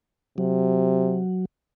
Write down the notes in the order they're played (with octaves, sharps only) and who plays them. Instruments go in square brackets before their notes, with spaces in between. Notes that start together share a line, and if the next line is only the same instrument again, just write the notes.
[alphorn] C3 [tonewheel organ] F#3